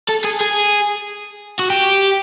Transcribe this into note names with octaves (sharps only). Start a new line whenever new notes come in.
A4
G#4
G#4
F#4
G4